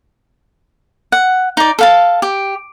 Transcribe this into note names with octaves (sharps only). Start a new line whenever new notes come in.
F#5
D#4 D5
A4 F5 A5
G4